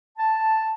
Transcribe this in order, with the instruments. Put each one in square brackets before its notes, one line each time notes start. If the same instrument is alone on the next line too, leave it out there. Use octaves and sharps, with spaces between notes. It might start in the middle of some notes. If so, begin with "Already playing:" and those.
[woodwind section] A5